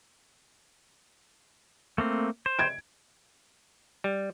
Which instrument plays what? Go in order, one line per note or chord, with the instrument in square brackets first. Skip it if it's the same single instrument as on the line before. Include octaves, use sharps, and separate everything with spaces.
[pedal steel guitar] A3 A#3 C4
C5
[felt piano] G#6 D7
[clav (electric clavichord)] G3